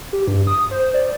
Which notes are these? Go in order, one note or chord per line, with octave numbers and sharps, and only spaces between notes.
G4
G2
D#6
C5
D5